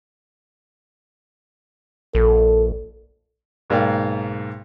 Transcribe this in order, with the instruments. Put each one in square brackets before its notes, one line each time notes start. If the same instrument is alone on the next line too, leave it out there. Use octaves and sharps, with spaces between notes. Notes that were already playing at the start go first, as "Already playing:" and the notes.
[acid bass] A#1 [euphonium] A4
[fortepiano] B1 G#2 A#3 D5 F5 G5